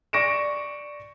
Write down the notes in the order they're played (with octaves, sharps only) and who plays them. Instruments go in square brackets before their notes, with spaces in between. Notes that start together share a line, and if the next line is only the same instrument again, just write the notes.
[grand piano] D5 C#6 A#6 D7 E7